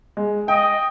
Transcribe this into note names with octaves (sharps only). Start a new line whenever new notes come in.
G#3
D#5 G5